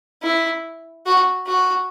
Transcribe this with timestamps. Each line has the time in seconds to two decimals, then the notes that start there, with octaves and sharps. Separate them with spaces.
0.23 E4
1.06 F#4
1.47 F#4